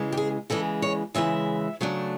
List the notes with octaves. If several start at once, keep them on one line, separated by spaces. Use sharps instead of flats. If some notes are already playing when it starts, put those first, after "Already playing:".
Already playing: C#3 E3 G#3
G4
G#4
C#3 E3 G#3 A4
C#5
C#3 E3 G#3 E5
C#3 F#3 A3 D4